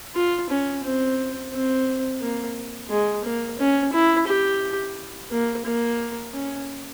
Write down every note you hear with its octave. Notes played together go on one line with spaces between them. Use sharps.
F4
C#4
C4
C4
A#3
G#3
A#3
C#4
E4
G4
A#3
A#3
C#4